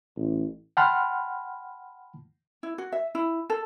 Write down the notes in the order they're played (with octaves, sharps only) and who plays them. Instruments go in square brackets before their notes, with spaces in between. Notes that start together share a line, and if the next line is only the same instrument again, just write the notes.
[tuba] A1
[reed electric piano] F#5 G5 A5 B5 C6 F6
[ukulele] E4
F#4
E5
E4
A4